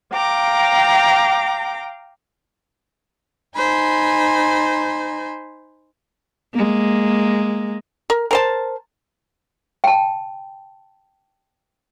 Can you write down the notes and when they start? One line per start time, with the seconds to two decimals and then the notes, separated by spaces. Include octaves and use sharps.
0.12 F5 G5 A#5 D6
3.56 D#4 C5 G#5 B5
6.54 G#3 A#3
8.10 A#4
8.31 A#4 C5 A5
9.84 G5 A5